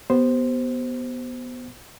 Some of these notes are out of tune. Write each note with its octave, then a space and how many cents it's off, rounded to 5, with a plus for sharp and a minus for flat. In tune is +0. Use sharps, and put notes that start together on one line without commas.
B3 +0 G4 -15 C5 +0